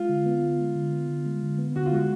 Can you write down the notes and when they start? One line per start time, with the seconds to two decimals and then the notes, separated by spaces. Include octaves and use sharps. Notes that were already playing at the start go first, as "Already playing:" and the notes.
Already playing: G#3 F4
0.09 D3
0.26 B3
0.42 D3
0.59 G#3
0.75 D3
0.93 B3
1.09 D3
1.26 G#3
1.43 D3
1.59 B3
1.76 D3 F#4
1.86 F4
1.92 G#3 F#4